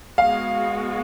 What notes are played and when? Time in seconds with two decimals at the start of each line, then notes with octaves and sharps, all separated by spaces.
0.17 G#3 B3 F#4 F5